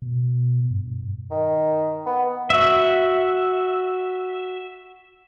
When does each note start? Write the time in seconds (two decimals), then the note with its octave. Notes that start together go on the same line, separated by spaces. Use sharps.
0.02 B2
0.71 G2
1.31 D#3
2.06 B3
2.50 F#4 E5